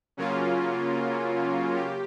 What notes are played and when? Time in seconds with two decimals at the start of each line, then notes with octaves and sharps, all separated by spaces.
0.17 C#3 F#3 A#3 C#4 F4
1.76 G4